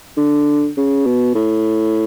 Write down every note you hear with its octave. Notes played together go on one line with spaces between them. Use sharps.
D3
C#3
B2
A2